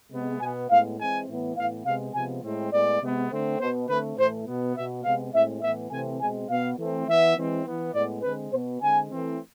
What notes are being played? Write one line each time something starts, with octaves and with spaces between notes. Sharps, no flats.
C3 G#3 B3
B2 B3 G#5
A2 G#3 B3 F5
E3 G#3 C4 G#5
A2 E3 B3
A2 E3 B3 F5
C3 G#3 B3 F5
C3 F3 G#3 B3 G#5
A2 G#3 C4
A2 G#3 B3 D5
C3 G#3 B3
D3 A3 C4
B2 B3 C5
D3 A3 C4 B4
A2 E3 A3 C5
B2 B3
B2 B3 E5
C3 G#3 B3 F5
A2 G#3 C4 E5
A2 E3 B3 E5
C3 E3 A3 C4 G#5
B2 G#3 C4 G#5
B2 B3 F5
E3 A3 C4
E3 B3 E5
E3 G#3 C4
E3 B3
A2 G#3 B3 D5
D3 G#3 C4 B4
B2 B3 C5
D3 G#3 C4 G#5
E3 A3 C4